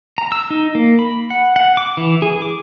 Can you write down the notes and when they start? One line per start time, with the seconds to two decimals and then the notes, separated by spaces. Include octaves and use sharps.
0.18 A#5
0.32 E6
0.50 D#4
0.75 A#3
0.99 B5
1.30 F#5
1.56 F#5
1.77 D6
1.97 E3
2.22 G#4
2.42 D6